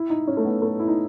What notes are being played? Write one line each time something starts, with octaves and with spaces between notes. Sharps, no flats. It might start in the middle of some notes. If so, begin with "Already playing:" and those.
Already playing: E4
D#4
C#4
A3
B3
A3
E4
D#4